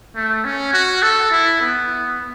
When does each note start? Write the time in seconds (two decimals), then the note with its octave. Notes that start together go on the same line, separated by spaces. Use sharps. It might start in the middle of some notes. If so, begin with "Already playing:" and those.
0.16 A3
0.44 C#4
0.73 F#4
1.03 A4
1.31 E4
1.61 B3